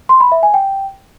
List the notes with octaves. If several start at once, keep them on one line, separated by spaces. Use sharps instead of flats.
C6
B5
E5
G#5
G5